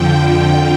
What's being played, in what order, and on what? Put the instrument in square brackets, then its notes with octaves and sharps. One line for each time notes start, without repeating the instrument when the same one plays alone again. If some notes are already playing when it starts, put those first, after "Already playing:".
Already playing: [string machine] F2 D3 F3 G5